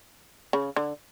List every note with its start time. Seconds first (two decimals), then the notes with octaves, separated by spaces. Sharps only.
0.53 C#3
0.76 D3